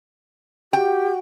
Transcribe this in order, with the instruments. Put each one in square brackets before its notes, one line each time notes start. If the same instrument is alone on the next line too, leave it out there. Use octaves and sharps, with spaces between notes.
[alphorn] F#4 [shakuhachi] G4 [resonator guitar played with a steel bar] G5